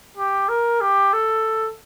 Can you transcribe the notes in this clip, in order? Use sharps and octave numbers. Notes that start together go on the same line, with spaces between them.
G4
A#4
G4
A4